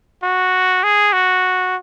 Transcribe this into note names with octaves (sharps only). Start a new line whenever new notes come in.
F#4
G#4
F#4